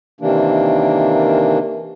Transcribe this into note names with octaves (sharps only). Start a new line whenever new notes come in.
C3 D#3 E3 A#3 D4